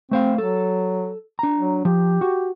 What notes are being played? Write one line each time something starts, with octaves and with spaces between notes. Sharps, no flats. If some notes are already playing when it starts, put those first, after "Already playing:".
A3 C4 C5 F5
F#3 A4
D4 A#5
F#3
F3 G4
F#4